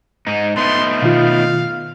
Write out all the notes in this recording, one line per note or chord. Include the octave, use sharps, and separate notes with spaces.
G#2 D#4
A3 B3 D#4 C6
B2 D#3 F4 F5